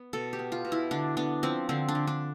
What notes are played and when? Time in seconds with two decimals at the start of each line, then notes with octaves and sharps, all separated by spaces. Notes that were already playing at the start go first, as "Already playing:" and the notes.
Already playing: B3
0.13 B2 A4
0.33 G4
0.39 B3
0.52 F4
0.65 B2
0.72 E4
0.91 D3 D4
1.17 B3 D4
1.43 F3 C4
1.69 D3 C4
1.89 D4
1.95 D3
2.07 D4